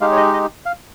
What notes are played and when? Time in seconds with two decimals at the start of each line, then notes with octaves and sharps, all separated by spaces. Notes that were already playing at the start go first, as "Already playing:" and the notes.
0.01 G#3 D#4 G4 F5
0.12 C#5
0.17 D#5
0.33 D#5
0.66 F5